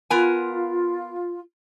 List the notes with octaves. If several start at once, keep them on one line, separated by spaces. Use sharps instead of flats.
B3 F4 A#4 G#5